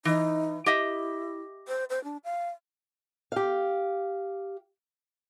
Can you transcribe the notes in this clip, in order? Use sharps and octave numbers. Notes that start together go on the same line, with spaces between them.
E3 D#4
E4 G4 D#5 E5
C5
C5
D4
F5
G4 F5